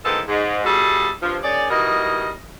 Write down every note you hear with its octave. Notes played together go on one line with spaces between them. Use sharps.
A2 D#3 F3 G#3 B3 A4
G#2
B2 G3 E4 F#4 G#4 A4
G2 F3
D#3 C#4 G#4 C#5 D5
E3 G3 D#4 F#4 A#4 D#5